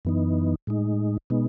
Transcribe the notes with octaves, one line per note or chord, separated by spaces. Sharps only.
F#2 E3 B3 D#4
A2 G#3 D#4
B2 G#3 B3 D#4